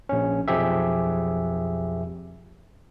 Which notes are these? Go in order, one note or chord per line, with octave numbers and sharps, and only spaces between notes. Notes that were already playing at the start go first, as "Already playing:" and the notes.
A#1 C#4
B1 F2 F3 G4 G#4 E5